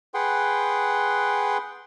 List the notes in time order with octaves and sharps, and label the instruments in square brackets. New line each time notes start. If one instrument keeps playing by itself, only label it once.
[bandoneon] G#4 B4 F#5 G5 C6